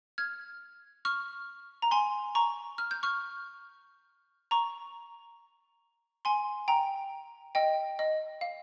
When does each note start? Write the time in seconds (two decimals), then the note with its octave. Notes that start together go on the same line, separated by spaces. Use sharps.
0.18 F6 G#6
1.05 C#6 F6
1.82 A#5
1.91 G#5 C6
2.35 A#5 C#6
2.78 F6
2.91 G6
3.03 C#6 F6
4.51 A#5 C#6
6.25 G#5 C6
6.68 G5 A#5
7.55 D#5 G5
7.99 D#5
8.41 F5